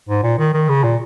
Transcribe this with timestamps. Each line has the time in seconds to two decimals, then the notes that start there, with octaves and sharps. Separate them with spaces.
0.09 G#2
0.23 A#2
0.39 D#3
0.54 D#3
0.69 C#3
0.84 A#2